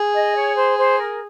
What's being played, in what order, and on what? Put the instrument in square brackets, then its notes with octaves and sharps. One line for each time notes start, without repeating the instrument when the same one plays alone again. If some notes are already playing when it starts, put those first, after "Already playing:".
Already playing: [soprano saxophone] G#4
[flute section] D#5
C#5
C5
C5
A#4